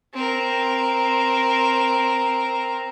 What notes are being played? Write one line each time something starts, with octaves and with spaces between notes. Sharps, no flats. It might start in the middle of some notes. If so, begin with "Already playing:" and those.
C4 A#4